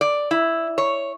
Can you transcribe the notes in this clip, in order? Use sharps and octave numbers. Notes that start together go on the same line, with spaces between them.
D5
E4
C#5